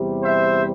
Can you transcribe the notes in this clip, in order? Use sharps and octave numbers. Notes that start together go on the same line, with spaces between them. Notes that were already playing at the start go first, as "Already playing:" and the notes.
Already playing: E2 C3 G3
C5 E5